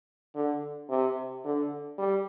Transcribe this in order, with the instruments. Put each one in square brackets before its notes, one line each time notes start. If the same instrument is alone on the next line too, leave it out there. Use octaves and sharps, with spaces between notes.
[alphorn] D3
C3
D3
G3